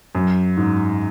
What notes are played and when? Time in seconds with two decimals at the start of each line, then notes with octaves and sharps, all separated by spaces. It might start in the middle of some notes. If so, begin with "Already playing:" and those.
0.15 F#2
0.57 G#2